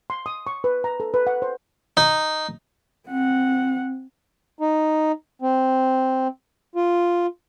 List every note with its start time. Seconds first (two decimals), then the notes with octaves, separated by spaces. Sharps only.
0.10 C6
0.26 D#6
0.47 C#6
0.64 B4
0.84 A#5
1.00 A4
1.14 B4
1.27 F#5
1.42 C5
1.97 D#4
3.08 C4 F#5
4.59 D#4
5.42 C4
6.75 F4